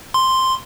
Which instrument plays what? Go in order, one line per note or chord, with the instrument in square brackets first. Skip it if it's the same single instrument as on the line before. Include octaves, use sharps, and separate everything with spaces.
[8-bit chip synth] C6